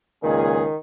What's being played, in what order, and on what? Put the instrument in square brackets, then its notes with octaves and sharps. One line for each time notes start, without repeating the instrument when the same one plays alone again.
[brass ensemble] C#2 A#2 G#4 [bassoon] D#3